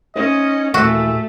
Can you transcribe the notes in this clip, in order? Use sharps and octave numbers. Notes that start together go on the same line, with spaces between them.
C#4 D#4 C5 D#5 E5
D#2 A#2 E3 A3 F#4 E5